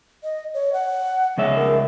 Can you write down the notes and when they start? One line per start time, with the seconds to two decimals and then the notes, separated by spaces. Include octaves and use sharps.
0.23 D#5
0.54 C#5
0.73 F#5
1.38 C#2 G#3 C#5 E5
1.56 A#4